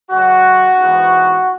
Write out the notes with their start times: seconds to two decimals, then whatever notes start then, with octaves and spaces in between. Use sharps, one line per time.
0.10 F#2 C#3 G#3 F#4
0.77 G#2 E3 B3